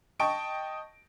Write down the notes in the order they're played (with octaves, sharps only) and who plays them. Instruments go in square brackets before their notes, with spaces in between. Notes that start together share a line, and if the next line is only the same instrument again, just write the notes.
[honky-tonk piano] D#5 G5 A5 C#6 D7